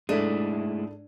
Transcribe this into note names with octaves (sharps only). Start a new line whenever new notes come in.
G#2 G#3 A3 D4 E4 A4 D#7